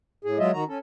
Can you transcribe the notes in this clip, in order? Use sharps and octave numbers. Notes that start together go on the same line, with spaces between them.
A2 G#4
F#3 G#3 F4 D#5 E5
D#3 F#4 A#5
C#4 A4